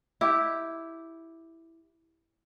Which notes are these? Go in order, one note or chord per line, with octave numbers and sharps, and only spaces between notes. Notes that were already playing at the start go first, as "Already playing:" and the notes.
E4 G4